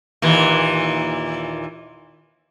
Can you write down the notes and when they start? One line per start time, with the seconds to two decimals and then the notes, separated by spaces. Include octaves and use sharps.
0.22 D#2 A#2 E3